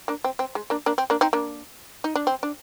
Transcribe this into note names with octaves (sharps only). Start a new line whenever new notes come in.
A#3 D4
C4
C4
G#3
A#3 D4
A#3 D4
C4
A#3 D4
C4 D#4
A#3 D4
D#4
D4
C4
D4